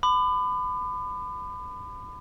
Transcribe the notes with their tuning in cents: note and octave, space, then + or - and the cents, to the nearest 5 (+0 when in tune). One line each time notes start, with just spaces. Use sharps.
B5 +30 D6 +40